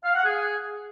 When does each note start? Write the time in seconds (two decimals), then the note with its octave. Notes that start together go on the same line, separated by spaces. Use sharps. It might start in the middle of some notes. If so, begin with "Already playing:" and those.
0.04 F5
0.14 F#5
0.25 G#4